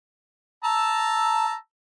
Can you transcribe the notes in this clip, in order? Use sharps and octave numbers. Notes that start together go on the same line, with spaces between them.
A5 A#5 E6